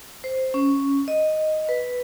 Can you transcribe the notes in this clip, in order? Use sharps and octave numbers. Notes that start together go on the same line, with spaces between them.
C5
C#4
D#5
B4